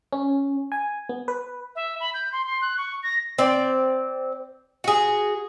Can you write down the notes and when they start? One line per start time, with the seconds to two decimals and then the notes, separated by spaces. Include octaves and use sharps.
0.13 C#4
0.72 G#5
1.09 B3
1.28 B4
1.76 E5
2.00 B5
2.14 G6
2.32 C6
2.46 C6
2.62 F#6
2.78 C#6
3.03 A#6
3.38 C4 D5
4.84 F#4 G#4